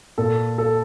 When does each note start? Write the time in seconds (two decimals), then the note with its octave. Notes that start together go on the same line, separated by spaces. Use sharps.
0.18 A#2 A4
0.58 A4